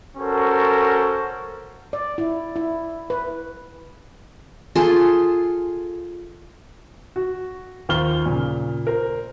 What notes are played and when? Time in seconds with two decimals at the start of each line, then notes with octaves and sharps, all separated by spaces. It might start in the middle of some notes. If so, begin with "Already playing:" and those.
0.18 C#4 F#4 A4 A#4 C5
1.93 D5
2.18 E4
2.56 E4
3.10 B4
4.75 F4 G#4 A4 C6
7.16 F#4
7.89 D#2 F4 C5 F6 G7
8.26 A#2 C#3
8.87 A#4 C5